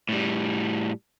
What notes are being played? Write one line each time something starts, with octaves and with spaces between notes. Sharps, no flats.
A2 G3